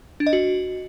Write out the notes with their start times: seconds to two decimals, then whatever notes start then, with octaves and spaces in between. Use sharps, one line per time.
0.20 D4
0.27 D#5
0.33 F#4